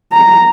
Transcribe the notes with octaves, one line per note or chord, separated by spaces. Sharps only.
A#5